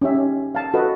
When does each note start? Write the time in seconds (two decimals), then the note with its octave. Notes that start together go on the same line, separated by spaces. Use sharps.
0.02 C#4 D#4 G4 E5
0.14 C#4
0.55 F5 A5
0.74 F#4 A4 B4 D#5